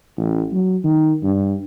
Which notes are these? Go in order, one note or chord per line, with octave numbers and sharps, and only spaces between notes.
A1
F#3
D#3
G2